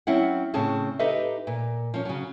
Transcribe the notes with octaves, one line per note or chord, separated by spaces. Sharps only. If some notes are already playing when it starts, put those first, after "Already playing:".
F#3 C4 C#4 E4 F5 F#5
A2 C#3 C4 C#4 G#4 A5
D#4 G4 A4 B4 D#5 E5
A#2
F3 C#4
C#3 F#3